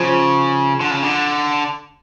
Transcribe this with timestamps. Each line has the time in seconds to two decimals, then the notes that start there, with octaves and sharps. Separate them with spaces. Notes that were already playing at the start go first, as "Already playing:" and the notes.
Already playing: C#3 F3
0.81 D3
0.91 C#3
1.03 D3